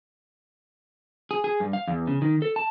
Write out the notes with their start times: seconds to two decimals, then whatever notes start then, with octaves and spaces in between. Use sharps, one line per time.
1.31 G#4
1.44 G#4
1.60 G2
1.73 F5
1.87 E2
2.07 C#3
2.22 D#3
2.42 A4
2.56 A5